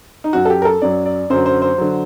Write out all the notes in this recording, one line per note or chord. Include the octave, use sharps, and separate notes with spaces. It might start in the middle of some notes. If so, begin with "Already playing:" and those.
D#4
F#2 F#3 F#4
A4
G4
A#4
A4
F#2 F#3 D5
D5
F#2 D3 F#3 C5
C5
C5
D3 F#3